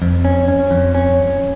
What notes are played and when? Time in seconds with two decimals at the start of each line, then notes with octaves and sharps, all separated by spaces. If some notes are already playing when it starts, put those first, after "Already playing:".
0.02 F2
0.25 C#4
0.48 C#4
0.71 F2
0.95 C#4